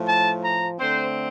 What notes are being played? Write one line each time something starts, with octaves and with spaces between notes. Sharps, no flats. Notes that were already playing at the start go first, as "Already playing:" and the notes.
Already playing: A2 F3 A3
A5
A#5
D3 A3 C4 C5